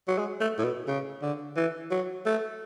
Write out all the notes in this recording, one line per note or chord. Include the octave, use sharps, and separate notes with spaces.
F#3
G#3
A3
A2
B2
C#3
D3
E3
F#3
A3